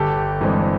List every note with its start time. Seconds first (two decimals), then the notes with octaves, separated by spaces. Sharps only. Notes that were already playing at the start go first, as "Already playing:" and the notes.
Already playing: G1 G4 A4
0.40 G2 E3 G#3 C4